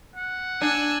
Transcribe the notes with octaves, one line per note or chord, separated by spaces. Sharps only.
F#5
D4 G#5 E6 F#6